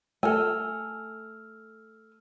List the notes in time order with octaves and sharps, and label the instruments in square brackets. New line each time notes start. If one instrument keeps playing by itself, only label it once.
[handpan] A3 [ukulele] A4 G#5 [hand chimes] E6 F6